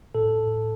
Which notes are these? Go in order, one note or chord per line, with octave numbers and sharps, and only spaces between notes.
A2 A4